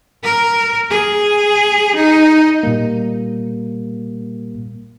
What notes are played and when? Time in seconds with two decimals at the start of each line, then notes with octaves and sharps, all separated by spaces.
0.24 A#4
0.91 G#4
1.96 D#4
2.63 A#2 G3 A#3